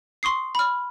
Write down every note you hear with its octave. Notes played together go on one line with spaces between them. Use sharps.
C6 C#6 D#6 C7
B5 F6